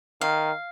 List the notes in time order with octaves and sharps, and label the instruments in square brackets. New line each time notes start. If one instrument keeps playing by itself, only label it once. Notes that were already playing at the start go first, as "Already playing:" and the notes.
[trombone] D#3 [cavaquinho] F5